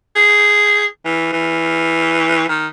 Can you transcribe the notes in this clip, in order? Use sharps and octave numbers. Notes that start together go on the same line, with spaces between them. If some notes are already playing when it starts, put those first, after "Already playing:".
G#4
E3
E3
D#3